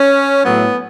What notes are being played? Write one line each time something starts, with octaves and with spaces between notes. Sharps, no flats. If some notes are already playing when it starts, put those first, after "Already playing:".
Already playing: C#4
A2 F#3 A3 B3